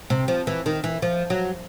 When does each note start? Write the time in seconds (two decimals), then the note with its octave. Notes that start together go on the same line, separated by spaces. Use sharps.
0.10 C3
0.28 F3
0.47 E3
0.66 D#3
0.84 E3
1.02 F3
1.30 F#3